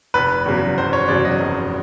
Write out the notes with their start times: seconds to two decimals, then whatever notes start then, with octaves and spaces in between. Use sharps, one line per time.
0.14 F1 B4
0.46 E2 C#3 F#3
0.77 F1 C5
0.93 C#5
1.08 E2 C#3 F#3 D5
1.25 D#5
1.40 F1